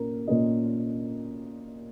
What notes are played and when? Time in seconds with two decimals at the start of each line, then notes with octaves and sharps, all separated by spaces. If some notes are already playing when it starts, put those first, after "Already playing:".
Already playing: A#2 A#3 C#4 A#4
0.27 A#2 A#3 C#4 D#5